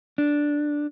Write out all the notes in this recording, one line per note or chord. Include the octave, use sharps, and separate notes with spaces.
D4